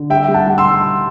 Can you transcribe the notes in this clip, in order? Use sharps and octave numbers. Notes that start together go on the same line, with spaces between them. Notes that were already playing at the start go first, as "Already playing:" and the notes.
Already playing: D3
G3 E5 G5
G3
F#5 A5
G3
C6 E6